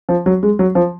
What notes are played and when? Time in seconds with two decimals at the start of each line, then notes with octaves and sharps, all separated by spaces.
0.09 F3
0.26 F#3
0.43 G#3
0.59 F#3
0.75 F3